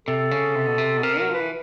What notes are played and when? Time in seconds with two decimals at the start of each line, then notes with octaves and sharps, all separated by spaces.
0.07 C3 A4
0.31 C#3
0.55 C3
0.66 B2
0.78 C3
0.97 B2
1.03 C3 A#4
1.19 F#3 A#4
1.30 F3 B4
1.40 E3